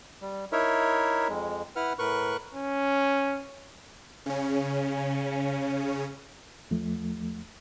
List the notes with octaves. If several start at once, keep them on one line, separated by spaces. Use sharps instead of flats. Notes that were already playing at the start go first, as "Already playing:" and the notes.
G3
D#4 E4 A#4 C#5 E5
F2 G#3
E4 B4 F#5 F6
A2 A#4 B4 C#6 F#6
C#4
C#3 C#4
E2 F3 A3